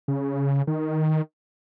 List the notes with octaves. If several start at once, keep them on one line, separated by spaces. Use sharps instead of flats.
C#3
D#3